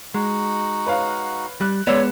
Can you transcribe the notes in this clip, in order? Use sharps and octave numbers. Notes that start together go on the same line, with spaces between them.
G#3 D#4 F#4 F#5
B4 C#5 F5
G3 F#6
G#3 B3 F4 C#5 D5 E6 E7